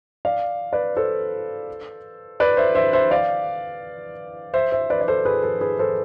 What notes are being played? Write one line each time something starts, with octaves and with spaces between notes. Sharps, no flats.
D5 F5
B4 D5
A4 C5
B4 D5
C5 E5
C5 E5
C5 E5
D5 F5
C5 E5
C5 E5
B4 D5
D5
A4 C5
G#4 B4
A4
G#4 B4
A4 C5